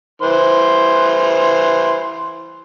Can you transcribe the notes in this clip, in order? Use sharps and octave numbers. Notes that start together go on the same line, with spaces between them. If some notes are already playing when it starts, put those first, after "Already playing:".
E3 C5 C6